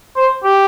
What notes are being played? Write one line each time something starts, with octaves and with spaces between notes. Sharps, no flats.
C5
G4